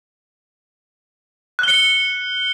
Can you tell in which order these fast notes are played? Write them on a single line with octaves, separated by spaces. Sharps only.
F#6 G7 C#7